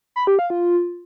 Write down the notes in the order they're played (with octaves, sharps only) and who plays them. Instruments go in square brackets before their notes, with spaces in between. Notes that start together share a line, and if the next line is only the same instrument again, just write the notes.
[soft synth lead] B5
G4
F5
F4